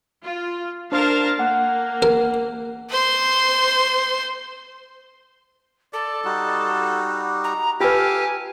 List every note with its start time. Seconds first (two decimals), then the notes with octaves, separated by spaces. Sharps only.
0.24 F4
0.92 D4 A#4 C5 F5 A5 C6
1.39 A#3 F#5 F#6
2.02 A#4
2.90 C5 C6
5.93 A4 D5
6.25 G3 D#4 F#4
7.44 A#5
7.81 F4 G4 A4 B4 F5 G#5